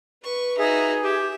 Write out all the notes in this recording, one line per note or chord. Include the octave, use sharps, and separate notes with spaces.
B4 C#6
D#4 F#4 G#4 E5
G4 E5